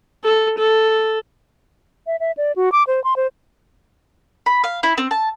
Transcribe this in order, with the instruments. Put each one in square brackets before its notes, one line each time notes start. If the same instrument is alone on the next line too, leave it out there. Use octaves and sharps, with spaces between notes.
[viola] A4
A4
[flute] E5
E5
D5
F#4
D6
C5
C6
C5
[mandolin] B5
F5
E4
C4
A5